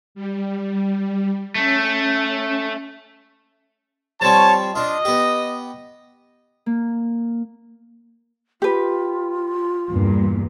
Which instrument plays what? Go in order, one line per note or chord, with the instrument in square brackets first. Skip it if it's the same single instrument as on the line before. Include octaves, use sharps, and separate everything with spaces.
[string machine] G3
[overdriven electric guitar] A3 [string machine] C#4
[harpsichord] F3 G3 C4 [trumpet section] C#5 A5
[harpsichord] D4 F4 [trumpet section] D#5
[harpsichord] B3 G4
[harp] A#3
[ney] F4 [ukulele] G4 B4
[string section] E2 G2 A#2